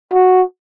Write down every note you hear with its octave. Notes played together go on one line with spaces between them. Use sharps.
F#4